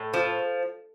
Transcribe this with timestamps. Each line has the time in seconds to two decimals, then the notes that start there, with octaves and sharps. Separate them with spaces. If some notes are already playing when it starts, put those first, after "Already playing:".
Already playing: A2
0.14 F3